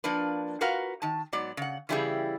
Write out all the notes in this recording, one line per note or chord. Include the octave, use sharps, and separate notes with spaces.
F3 A#3 D4 B4
F4 F#4 A#4 B4 F5 F#5
D#3 A5
G#2 F#3 B3 D5
C#3 F#5
C#3 E3 G3 E4 G4 G#4